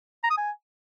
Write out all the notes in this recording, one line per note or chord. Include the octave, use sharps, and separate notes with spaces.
A#5
D#6
G#5